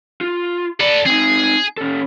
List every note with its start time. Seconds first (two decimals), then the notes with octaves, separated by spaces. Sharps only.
0.21 F4
0.81 A4 B4 D5
1.06 C4 D#4 G#4
1.78 C#4 A4